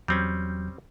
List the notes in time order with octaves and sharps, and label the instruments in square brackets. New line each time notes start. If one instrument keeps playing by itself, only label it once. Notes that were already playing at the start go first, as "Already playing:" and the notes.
[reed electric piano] E2 F#3 G6 [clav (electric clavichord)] G3 C4 C#4